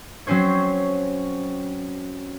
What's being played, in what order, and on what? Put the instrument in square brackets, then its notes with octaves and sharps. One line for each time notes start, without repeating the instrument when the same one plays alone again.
[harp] F#3 C4 C#4 C5 C#5